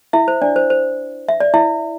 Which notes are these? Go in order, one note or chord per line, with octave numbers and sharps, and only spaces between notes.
E4 E5
C5
D4 D5
C5
C5
E5
D5
E4 E5